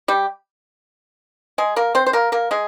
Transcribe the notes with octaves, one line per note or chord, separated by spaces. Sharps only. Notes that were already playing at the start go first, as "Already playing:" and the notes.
G3 G4
G#3 G#4
A#3 A#4
C4 C5
C5
A#3 A#4
A#3 A#4
G#3 G#4